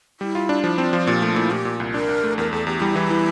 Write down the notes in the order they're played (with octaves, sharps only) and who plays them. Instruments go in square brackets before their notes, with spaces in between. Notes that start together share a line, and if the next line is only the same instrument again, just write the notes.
[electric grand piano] G3 [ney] E4
[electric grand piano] F4
D4
[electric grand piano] F3 [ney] E4
[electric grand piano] C4
[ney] F4
[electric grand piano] F3
[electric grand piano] A#2 [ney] G4
[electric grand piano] A3 [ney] F4
[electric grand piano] A#2 [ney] E4
[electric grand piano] A#2 [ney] G4
[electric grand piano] A#2
C2
[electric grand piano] D4 [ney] A#4
[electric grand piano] D4
A3
[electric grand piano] E2 [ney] A#4
[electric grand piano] E2 [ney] A4
[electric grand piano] E2 [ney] G4
[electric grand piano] G3 [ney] E4
[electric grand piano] E3
E3